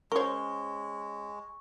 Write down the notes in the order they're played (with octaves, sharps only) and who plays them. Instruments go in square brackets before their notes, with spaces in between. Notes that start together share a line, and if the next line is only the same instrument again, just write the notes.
[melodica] G#3 [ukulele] C#4 C5 [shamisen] A#4 C#5 [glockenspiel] C#6